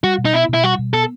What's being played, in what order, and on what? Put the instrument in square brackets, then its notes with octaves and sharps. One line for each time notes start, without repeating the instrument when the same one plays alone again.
[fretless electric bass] G3 [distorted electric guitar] F#4
[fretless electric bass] B2
[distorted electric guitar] D#4
[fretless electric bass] B3 [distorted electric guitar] E4
[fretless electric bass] B2 [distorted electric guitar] E4
[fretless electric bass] G3 [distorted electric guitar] F#4
[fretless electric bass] B2
[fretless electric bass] B3 [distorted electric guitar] A4